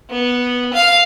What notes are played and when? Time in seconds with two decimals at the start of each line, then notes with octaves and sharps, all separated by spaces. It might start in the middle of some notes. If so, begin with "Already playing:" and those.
0.10 B3
0.74 F5